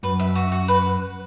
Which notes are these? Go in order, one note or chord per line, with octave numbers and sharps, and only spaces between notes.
F#2 B4
E5
F#4
F#4
B4